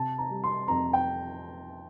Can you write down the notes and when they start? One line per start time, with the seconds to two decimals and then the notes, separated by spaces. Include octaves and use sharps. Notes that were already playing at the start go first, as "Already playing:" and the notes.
Already playing: C3 A5
0.18 A#5
0.30 G3
0.44 C6
0.68 F2 A#5
0.93 G5